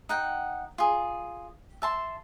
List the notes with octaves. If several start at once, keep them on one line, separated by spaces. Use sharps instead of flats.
D#4 F#5 G5
F4 G#4
E5 A5 C6